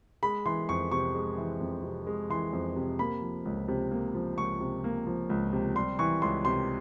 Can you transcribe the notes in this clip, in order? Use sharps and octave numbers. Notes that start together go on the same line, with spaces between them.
G#3 B5
E3 C6
F2 C#6
C3 C#6
G#3
E3
F2
C3
G#3
E3 C6
F2
C3
A#3 B5
F3
C#2
C3
A#3
F3
C#2 C#6
C3
A#3
F3
C#2
C3
G3 C6
E3 C#6
C#2 C6
C3 C6